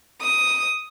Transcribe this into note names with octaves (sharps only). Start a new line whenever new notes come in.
D#6